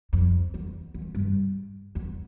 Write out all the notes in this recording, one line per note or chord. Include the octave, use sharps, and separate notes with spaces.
F2
E2
E2
G2
E2